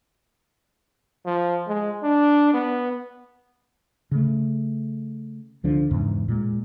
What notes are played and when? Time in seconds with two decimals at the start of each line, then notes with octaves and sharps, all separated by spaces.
1.26 F3
1.68 G#3
2.03 D4
2.54 B3
4.11 C#3 A3
5.63 C#2 D3 F3 D4
5.91 E2 G#2 C#3
6.28 A#2 G#3